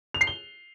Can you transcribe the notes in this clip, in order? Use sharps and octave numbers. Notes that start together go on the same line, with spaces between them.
F7
C7
G7